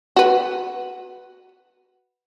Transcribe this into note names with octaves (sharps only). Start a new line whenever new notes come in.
F#4 B4